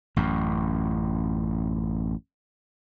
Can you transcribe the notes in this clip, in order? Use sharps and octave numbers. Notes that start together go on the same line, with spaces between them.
A1 F#2